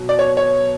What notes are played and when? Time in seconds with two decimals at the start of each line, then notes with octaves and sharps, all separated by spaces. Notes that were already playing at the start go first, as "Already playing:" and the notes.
Already playing: B2 F#3
0.09 D5
0.19 C#5
0.37 C#5